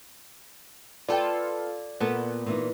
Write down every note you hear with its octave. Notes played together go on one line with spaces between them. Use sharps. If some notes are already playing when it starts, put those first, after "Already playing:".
B3 F4 A4 D5 F#5 G5
A#2 B3 A4
A#2 E3 D#4